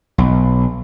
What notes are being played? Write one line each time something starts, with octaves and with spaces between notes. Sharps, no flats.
B1